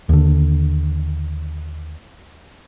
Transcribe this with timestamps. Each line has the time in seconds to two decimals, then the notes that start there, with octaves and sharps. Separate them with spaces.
0.09 D#2 D3